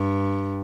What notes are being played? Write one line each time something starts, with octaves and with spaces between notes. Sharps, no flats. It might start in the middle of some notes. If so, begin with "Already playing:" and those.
Already playing: G2